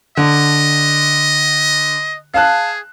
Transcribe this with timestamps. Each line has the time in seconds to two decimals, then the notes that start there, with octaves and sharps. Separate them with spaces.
0.17 D3 D#5
2.34 G#4 F5 A5 F#6